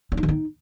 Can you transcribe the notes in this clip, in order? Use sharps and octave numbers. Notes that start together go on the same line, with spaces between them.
C#4
D#4
D#3
D#4